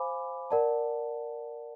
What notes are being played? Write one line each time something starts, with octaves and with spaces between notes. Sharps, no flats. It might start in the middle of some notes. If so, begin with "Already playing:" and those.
Already playing: C5 F5 G#5 B5 D6
A#4 D5 F#5 A5